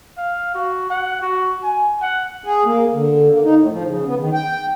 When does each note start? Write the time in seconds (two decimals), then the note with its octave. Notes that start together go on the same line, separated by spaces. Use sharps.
0.17 F5
0.55 F#4
0.90 F#5
1.22 F#4
1.63 G#5
2.02 F#5
2.43 G#4
2.65 A#3
2.94 D3
3.31 A#3
3.44 D#4
3.59 A2
3.72 F3
3.86 C#3
4.06 B3
4.20 D#3
4.34 G5